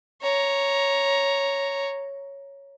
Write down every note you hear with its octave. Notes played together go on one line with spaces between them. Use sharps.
C#5 A#5